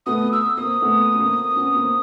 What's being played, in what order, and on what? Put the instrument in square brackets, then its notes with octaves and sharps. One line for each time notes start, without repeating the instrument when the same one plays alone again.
[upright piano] A3 B3 [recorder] D#6
[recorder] E6
[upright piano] A#3 C4 [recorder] D#6
[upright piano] A3 B3
C#4
A#3 C4
C4
B3 C#4
A#3 C4